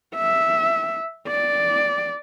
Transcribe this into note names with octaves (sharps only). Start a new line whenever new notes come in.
E5
D5